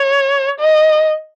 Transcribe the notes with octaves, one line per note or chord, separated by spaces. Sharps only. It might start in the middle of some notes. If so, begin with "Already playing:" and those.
Already playing: C#5
D#5